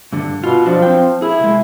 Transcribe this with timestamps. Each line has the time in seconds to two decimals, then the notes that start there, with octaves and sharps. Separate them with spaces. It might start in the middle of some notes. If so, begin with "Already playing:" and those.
0.12 G2 D3
0.43 B2 F4
0.66 F3 F#3 D4 F#4
0.82 C4 G5
1.22 E4 G#4
1.40 C2 G#3